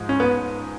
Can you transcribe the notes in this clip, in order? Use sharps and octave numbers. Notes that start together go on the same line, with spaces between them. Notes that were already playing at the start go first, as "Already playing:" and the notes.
Already playing: G#2 F3 G#3
C#4
B3